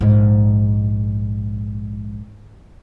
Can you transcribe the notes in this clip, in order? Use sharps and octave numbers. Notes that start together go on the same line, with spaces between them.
A#1 G#2